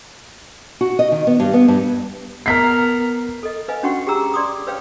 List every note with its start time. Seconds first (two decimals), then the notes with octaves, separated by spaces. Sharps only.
0.81 F#4
0.99 D#5
1.12 D#3
1.27 B3
1.40 G2
1.53 B3
1.68 G2
2.46 B3 A#4 A#5 B6 C7
3.43 A4 D#5
3.68 B4 D#5 F5 G#5
3.83 C#4 D4 F#4 F#5 G5 C#6
4.07 G4 G#4 G5 A#5 E6
4.34 D5 C6 D6 D#6
4.67 B4 C#5 F5 G5